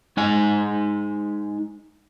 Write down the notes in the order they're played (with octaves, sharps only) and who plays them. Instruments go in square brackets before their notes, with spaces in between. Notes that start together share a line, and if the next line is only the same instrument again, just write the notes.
[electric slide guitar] G#3 D#4 G#5